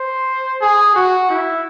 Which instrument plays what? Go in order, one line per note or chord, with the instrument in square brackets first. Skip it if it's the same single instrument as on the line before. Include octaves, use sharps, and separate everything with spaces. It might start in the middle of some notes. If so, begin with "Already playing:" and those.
Already playing: [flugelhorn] C5
G#4
F#4
E4